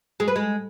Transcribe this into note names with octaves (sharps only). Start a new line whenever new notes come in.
G#3
B4
G#3